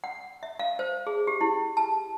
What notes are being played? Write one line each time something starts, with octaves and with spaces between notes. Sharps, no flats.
F#5
E5
F5
C5
G#4
G4
E4
A5